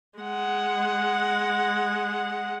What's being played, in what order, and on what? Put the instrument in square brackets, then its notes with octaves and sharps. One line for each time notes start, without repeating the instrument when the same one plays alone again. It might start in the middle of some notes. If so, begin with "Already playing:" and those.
[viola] G#3 F#5